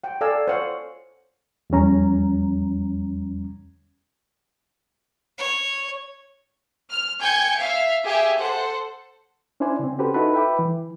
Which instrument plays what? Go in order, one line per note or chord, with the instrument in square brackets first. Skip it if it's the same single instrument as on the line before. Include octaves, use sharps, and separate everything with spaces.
[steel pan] F#5 G5
A4 D5 F5 G#5 E6
C5 C#5 F5 F#5
[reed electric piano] E2 F3 G3 C#4 A#5
[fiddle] C#5
[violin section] F6
G5 G#5 G6 G#6 C#7
E5 F5
G4 G#4 E5
A4 C5 F#5
[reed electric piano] C#4 D4 E4 C5 D5 G#5
C#3 C4
C#4 F#4 G4 A4 B4 C5
D#4 E4 F#4 A4 B4
B4 E5 G5 B5 D6
E3